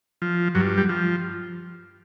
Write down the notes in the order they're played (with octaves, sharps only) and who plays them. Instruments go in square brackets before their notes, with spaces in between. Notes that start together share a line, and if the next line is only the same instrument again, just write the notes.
[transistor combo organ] F3
G2 F#3
G3
F3